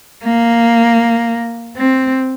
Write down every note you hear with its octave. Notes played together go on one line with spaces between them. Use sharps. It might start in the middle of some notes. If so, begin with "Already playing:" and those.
A#3
C4